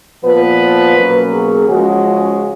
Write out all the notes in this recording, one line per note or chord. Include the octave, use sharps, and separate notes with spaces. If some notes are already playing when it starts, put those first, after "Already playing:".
A#2 F3 B3 B4
B2 F#3 A#3 C#4
G#4
C#3 F3 G#3 C#4 F#4